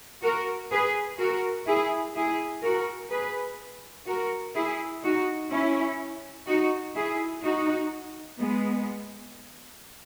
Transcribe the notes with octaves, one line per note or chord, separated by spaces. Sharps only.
F#4 A#4
G#4 B4
F#4 A#4
E4 G#4
E4 G#4
F#4 A#4
G#4 B4
F#4 A#4
E4 G#4
D#4 F#4
C#4 E4
D#4 F#4
E4 G#4
D#4 F#4
G#3 B3